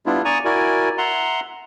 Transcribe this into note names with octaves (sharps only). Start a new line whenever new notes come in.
G3 B3 D4 E4 F4
D5 G#5 A#5 C#6 D#6
E4 F#4 A#4 D5 G#5
E5 F#5 A#5 C6